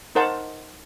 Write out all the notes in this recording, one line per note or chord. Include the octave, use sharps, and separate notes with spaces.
D#4 A#4 C5 F#5 A5